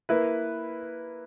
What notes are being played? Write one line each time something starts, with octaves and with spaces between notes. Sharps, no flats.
A#3 E4 B4